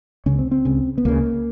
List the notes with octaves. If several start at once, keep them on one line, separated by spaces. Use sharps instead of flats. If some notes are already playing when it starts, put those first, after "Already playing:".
C#2 C#3 C#4
C4
C4
C#2 C#3
B3
C#2 C#3 A#3